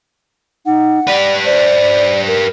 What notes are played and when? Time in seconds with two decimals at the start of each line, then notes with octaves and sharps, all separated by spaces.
0.66 D#4 F#5
1.07 G4 B4 D5
1.45 C5 D5
2.27 A#4